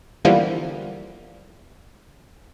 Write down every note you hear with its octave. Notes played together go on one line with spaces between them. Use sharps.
D3 E3 F3 G3 A#3 B3